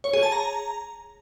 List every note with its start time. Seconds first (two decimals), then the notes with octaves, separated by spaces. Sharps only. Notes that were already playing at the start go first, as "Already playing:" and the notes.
0.04 C#5
0.13 G#4
0.23 A5
0.32 A#5